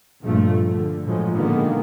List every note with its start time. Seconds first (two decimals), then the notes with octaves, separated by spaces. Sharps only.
0.22 A#1 G2 A#2 F3 A3
0.69 D3
1.05 A2 F3 F#3 G#3
1.35 A#2 D3 D#3 G#3 A#3 B3